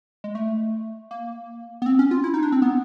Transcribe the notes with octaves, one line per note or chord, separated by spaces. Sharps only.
G#3
A3
A#3
B3
C4
C#4
F4
E4
D#4
D4
C4
B3